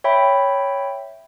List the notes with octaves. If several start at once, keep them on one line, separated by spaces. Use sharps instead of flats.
C#5 E5 G5 B5